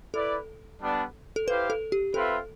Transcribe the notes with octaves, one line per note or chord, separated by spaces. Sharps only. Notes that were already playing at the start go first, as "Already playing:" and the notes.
E4 A4 B4 D5
G3 B3 D4
A4
E4 G4 B4 C5 F5
A4
G4
C4 F4 A4 B4 E5